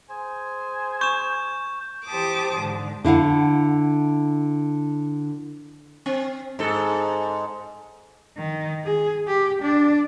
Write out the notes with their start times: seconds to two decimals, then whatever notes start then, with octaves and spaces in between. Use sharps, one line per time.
0.10 G#4 C5 G#5
1.01 C#6 G6 E7
2.08 E3 G4 C5 A5 D6 D#6
2.56 G#2 D3
3.04 D3 E4 F5 F#5
6.06 C4
6.59 G#2 A4
8.37 D#3
8.84 G#4
9.27 G4
9.62 D4 D5